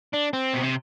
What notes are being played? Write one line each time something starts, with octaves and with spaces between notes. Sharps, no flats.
D4
C4
B2
C3